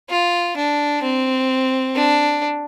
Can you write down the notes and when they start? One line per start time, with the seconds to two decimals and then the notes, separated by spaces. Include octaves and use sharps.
0.10 F4
0.56 D4
1.03 C4
1.96 D4